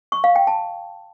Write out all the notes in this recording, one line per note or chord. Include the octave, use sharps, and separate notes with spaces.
C#6
F5
G5
A5